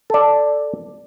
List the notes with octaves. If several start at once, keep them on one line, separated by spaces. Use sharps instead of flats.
A4 D5